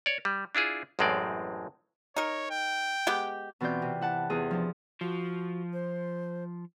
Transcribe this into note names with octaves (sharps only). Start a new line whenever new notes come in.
C#5 D5
G3
D4 E4 F4 G#4
A1 F#2 A2 G#3 C4 D5
D#4 A#4 C#5
G5
G#3 B3 G4
B2 E3 C4 F4 D5 G6
C3
E4 F#5 A5
E2 E4 F4 G#4
F3 D4
F3 F#4
C5